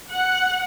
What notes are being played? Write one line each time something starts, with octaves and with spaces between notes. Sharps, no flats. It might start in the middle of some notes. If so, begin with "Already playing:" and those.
F#5